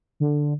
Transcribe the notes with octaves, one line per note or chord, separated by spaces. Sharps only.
D3